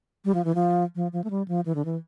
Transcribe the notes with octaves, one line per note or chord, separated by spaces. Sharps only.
G3
F3
E3
F3
F3
F3
A3
G3
F3
E3
D3
E3